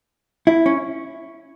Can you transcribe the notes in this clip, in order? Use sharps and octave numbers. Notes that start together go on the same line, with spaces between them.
E4
C#4